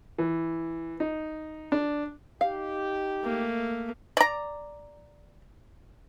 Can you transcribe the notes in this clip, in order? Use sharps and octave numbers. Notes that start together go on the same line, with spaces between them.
E3
D#4
D4
D#4 G4 F5
A3 A#3
D5 A#5